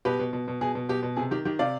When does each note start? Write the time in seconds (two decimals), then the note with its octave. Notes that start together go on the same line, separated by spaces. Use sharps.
0.05 B2 G4 B4
0.20 B2
0.33 B2
0.48 B2
0.61 B2 G#4
0.75 B2
0.89 B2 G4
1.03 B2
1.16 C3 G#4
1.31 D#3 G4
1.45 D#3 G4
1.59 C3 D5 F5